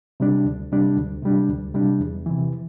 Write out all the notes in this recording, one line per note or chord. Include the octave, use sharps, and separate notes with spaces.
C3 G3 D4
D2
C3 G3 D4
D2
C3 G3 D4
D2
C3 G3 D4
E2
C3 E3